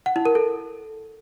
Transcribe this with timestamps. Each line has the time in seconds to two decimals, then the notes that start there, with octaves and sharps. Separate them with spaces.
0.06 F#5
0.16 E4
0.25 A#4
0.35 A4